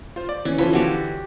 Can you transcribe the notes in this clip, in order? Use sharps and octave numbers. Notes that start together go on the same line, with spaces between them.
F4 C5
D5
E3 C#4
D3 E3 F3 E4 B5
F#4 G4 D5